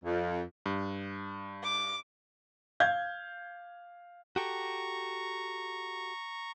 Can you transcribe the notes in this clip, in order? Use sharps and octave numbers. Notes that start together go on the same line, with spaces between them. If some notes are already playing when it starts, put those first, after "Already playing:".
F2
G2
D6
F5 G6 G#6
F#4 G4 A4 A#5 C#6